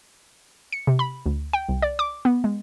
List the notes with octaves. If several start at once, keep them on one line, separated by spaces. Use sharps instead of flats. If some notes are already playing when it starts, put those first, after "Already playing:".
C#7
C3
B5
D2
G5
C2
D5
D6
B3
G#3